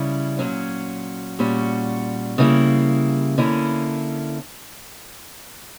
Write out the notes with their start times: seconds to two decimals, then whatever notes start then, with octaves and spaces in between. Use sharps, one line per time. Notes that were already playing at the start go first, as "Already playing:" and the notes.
Already playing: C#3 G3 C#4 E4
0.39 A#2 F#3 C#4
1.39 A#2 G3 C#4 F#4
2.38 C#3 G3 A#3 E4
3.38 D3 A#3 C#4 E4